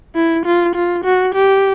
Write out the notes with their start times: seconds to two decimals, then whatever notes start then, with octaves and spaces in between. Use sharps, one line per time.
0.15 E4
0.45 F4
0.75 F4
1.04 F#4
1.35 G4